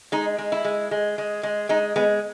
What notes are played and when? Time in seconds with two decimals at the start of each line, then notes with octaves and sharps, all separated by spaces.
0.12 G#3 D#4
0.38 G#3
0.52 E4
0.64 G#3
0.91 G#3
1.18 G#3
1.43 G#3
1.69 G#3 D#4
1.96 G#3 B3